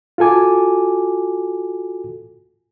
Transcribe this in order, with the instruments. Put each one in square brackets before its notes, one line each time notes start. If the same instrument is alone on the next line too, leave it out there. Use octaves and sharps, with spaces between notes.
[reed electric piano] F4 F#4 A4 G#5 D6